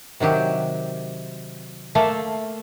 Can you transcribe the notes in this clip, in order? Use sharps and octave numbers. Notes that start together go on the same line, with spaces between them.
C3 D#3 F#3 G4
A3 A#3 A4 E5 F5